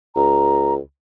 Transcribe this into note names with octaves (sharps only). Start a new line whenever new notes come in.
C#2 A#5